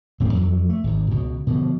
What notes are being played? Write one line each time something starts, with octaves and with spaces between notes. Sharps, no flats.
D#1 A2 E3 C4
F2 E3 F#3
A3
G#1 G#2
C#2 B2
B2 D3 F3